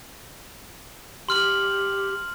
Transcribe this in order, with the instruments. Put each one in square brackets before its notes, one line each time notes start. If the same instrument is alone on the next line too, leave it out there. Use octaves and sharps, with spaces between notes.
[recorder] G4 [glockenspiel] C6 F6 F#7